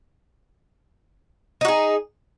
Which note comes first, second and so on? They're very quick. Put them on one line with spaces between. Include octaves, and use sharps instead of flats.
D#4 F#4 G#4